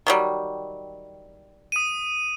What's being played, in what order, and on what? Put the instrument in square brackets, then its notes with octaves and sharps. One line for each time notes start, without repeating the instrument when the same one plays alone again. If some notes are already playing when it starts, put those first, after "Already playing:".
[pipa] D#3 F#3 G3
[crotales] D#6 D#7